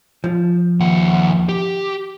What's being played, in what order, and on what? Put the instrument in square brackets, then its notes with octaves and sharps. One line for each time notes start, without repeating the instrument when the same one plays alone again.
[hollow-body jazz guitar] F3
[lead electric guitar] D#2 F#5
G4